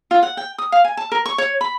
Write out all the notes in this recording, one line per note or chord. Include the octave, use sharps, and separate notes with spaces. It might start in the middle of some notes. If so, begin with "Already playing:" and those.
F4
F#5
G5
D#6
F5
G#5
A5
A#4
C#6
C#5
B5